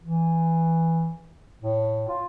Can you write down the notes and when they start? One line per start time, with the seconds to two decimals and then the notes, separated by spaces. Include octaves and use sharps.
0.02 E3
1.62 A2
2.08 F4